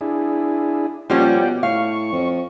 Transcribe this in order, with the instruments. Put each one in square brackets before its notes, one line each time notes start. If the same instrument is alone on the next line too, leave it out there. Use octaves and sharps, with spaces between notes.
[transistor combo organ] D4 E4 G#4
[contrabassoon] A#2 [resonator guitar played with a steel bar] F3 G3 C#4 [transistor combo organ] D5 F#5 G5
[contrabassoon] B2
[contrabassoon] A2 [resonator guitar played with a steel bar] F5 [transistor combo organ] C#6
[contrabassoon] F2